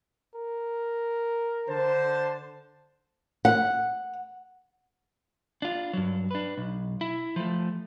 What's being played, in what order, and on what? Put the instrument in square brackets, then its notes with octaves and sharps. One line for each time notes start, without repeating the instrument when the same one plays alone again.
[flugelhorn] A#4
[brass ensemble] D3 C5 A5
[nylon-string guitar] F#5
[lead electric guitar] D4 F4
G2 F#3
D4 B4
B1
E4
F3 A3